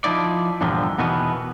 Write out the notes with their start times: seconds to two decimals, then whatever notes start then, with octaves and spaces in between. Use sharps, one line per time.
0.04 F3 D#4 E4 D5
0.61 E2 G2 A#2 D3 F3
0.99 E2 B2 D#3 E3 B3